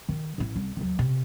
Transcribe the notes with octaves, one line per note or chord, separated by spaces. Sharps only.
D#3
A1 E4
C2
D#2 F#3
C3